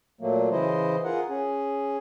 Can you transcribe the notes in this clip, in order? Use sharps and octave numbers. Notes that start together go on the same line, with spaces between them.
A#2 F#3 A3 A#3
C#3 E3 E4 C5 D#5
F4 G#4 A#4 F#5
C#4 G#4